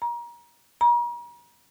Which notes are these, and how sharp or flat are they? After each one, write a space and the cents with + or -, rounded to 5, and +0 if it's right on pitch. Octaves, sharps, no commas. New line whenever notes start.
A#5 +30
A#5 +40